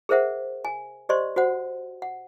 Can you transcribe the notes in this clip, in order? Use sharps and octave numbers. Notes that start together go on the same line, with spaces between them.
G#4 A#4 C5 E5 F#5
G#5
G4 C5 D5 D#5 C6
F#4 C5 F#5
F#5